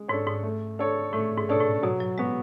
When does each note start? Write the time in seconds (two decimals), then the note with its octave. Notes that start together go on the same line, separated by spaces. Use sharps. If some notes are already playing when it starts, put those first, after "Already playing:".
Already playing: G#3
0.08 G#2 D4 A4 C#5
0.27 G#2
0.43 A3
0.79 D4 A4 C#5
1.13 A2 A3
1.37 G#2
1.49 B2 D4 A4 C#5
1.60 A2
1.83 B2 F#3
2.00 F#3
2.18 G#3 B3 F#4